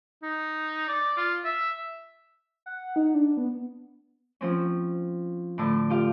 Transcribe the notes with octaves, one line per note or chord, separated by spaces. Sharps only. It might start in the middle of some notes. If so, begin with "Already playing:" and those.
D#4
D5
F4
E5
F#5
D#4
D4
B3
F3 C4 C#4
A2 D3
F4 G4 F5